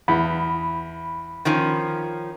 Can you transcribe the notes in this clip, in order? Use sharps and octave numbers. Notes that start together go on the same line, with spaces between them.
E2 B5
D#3 F3 C#4